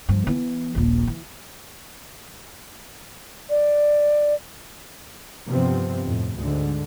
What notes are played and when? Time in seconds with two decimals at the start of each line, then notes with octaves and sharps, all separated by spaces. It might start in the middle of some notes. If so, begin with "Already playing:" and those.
0.09 G2 F3
0.27 E3 B3
0.75 D#1 A#1
1.07 E3
3.50 D5
5.47 G2 C3 F3 B3 C4
6.05 F2 A2
6.36 D2 G#2 D3